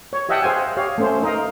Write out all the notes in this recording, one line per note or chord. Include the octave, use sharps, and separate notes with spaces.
C#5
G4 D#5 E5 F#5 G5 A5
G#4 C5 F5 G5 G#5
G4 C#5 F5
A3 C#4 C5
D#4 A#4 D#5 F5